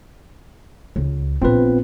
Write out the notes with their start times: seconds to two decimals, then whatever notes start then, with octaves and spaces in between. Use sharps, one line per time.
0.96 C#2
1.42 A#1 B3 C4 F4 B4